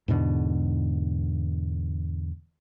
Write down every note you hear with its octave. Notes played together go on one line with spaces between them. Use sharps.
E2 G#2 B2 D3